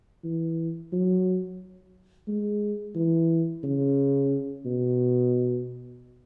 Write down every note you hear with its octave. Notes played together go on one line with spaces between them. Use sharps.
E3
F#3
G#3
E3
C#3
B2